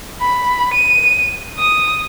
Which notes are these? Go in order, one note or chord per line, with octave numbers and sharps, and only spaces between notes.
B5
D#7
D#6